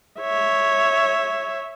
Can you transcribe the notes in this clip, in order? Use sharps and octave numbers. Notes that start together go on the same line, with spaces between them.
C#5 E5